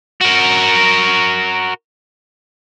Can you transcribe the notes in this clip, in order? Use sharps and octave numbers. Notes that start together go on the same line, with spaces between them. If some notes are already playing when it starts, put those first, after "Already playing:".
F#4 A#4